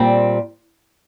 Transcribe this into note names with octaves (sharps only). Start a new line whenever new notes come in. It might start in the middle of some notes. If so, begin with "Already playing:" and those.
Already playing: A#2 G3 C4